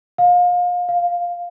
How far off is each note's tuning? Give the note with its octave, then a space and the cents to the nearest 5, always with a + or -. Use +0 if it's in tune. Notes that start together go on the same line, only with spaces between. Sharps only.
F5 +30
F5 +5